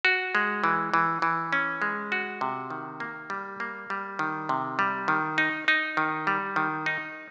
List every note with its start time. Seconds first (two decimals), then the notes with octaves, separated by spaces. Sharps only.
0.05 F#4
0.35 G#3
0.64 E3
0.94 E3
1.22 E3
1.53 C#4
1.82 G#3
2.12 F#4
2.41 C3
2.70 D#3
3.00 A#3
3.30 G3
3.60 A#3
3.90 G3
4.19 D#3
4.49 C3
4.79 G3
5.08 D#3
5.38 D#4
5.68 D#4
5.97 D#3
6.27 G3
6.56 D#3
6.86 D#4